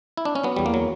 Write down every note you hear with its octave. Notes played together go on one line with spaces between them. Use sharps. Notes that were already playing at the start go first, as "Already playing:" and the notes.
E4
D4
C#4
F#3 B3
E2 G3
A#3
F#3